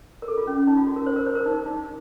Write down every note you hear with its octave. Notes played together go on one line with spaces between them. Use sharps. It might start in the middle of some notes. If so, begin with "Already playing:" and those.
A#4
A4
F4
C#4
C#4
D#4
F4
F#4
A#4
C5
A#4
C5
A#4
D#4
D#4